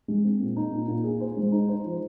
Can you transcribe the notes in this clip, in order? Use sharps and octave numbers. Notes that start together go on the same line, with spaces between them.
G#3
C4
A#2
D#4
A#2
A#2
G#4
C5
G#3
D#4
C5
F3